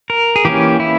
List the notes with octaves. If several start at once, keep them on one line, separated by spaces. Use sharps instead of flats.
A#4
G#4
E3 A#3 C#4 G4
E4